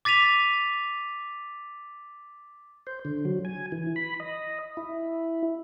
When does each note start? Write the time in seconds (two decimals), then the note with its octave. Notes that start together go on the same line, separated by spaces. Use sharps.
0.05 D6 A6 B6 D#7 F7
2.87 C5
3.05 D3
3.25 F#3
3.45 G#5
3.72 E3
3.96 B5
4.20 D#5
4.77 E4